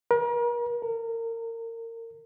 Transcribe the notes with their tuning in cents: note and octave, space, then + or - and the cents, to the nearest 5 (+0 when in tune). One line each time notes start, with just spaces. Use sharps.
A#4 +40
A#4 -30